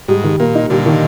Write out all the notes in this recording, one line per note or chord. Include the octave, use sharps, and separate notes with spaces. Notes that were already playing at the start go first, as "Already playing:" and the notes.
G#2 G3
D#3
A#2 A#3
D#4
A#2 D3 G3
D#3